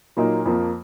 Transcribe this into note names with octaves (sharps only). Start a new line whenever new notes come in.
A#2 F#3 A#3 D#4
F2 F3 A#3